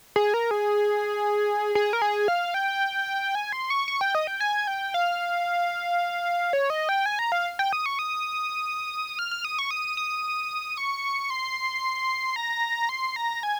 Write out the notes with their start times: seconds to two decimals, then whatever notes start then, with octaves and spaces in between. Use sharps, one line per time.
0.16 G#4
0.34 A#4
0.51 G#4
1.75 G#4
1.93 A#4
2.02 G#4
2.28 F5
2.54 G5
3.35 G#5
3.52 C6
3.70 C#6
3.88 C#6
4.01 G5
4.15 D#5
4.27 G5
4.40 G#5
4.67 G5
4.94 F5
6.53 C#5
6.70 D#5
6.89 G5
7.06 G#5
7.19 A#5
7.32 F5
7.59 G5
7.73 D#6
7.86 C#6
7.99 D#6
9.19 F6
9.31 F6
9.45 D#6
9.59 C#6
9.71 D#6
9.97 D#6
10.77 C#6
11.30 C6
12.36 A#5
12.89 C6
13.16 A#5
13.43 G#5